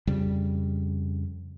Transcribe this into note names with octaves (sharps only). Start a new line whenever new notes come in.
F2 C#3 G3